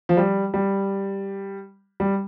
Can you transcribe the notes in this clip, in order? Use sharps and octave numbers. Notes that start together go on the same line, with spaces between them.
F3
G3
G3
G3